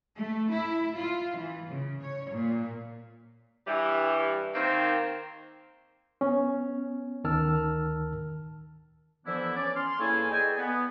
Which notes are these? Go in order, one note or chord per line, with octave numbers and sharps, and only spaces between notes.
A3
E4
F4
E3
C#3
C#5
A#2
G2 E3 G3
D#3 A#3 C4
B3 C#4
D2 D#3 A#4 A5 E6 F6
D3 E3 F3 B3 D4 E4
C#4 D5
C6 F6
E2 A#3 E4 A4 C#5 G#5
G#4 A4 D5 D#5 G5 G#5
B3